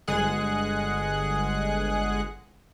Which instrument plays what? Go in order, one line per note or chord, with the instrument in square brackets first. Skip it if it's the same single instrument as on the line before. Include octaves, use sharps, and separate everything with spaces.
[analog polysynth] G1 G#3 G#4 F#5 F#6